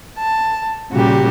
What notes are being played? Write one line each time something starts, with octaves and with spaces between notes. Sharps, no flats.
A5
A#2 C#3 G3 F#4 G4